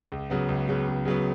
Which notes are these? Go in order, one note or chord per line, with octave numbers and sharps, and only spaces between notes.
C#2
C#3 F#3 B3
C#2
C#3 F#3 B3
C#2
C#3 F#3 B3